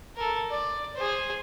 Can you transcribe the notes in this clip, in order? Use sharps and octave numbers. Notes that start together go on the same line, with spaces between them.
A4 A#4
D5
G#4 C5